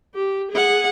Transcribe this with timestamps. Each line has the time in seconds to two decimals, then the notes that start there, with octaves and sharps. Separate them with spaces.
0.15 G4
0.51 G#4 F#5